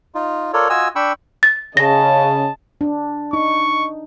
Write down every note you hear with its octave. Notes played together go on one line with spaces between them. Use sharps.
D#4 F4
F4 A4 A#4 C#5 D5
F4 F#4 D#5 G#5 E6
D4 G5 B5 C#6 E6
A6
C#3 D#5 A5 A#6
D4
D#4 C#6